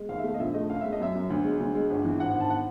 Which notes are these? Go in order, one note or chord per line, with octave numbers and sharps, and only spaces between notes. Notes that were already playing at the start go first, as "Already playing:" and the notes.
Already playing: G#3
D#2 F5
E5
A3 F5
D#5
A#1 E5
A3 D#5
F#1 F5
G#3 E5
D#5
F#2 E5
F#2
D2
G#3
D2
G#3
G1
E3
G#1 F#5
F#5
G#1
A5
F#5